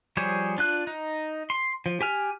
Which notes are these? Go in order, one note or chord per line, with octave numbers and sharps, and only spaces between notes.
F3 G3 G#4 C5 C#5
D4 F4 F#6
D#4
C6
F3
G4 G#5 F6